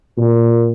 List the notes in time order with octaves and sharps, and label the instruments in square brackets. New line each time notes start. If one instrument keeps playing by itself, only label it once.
[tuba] A#2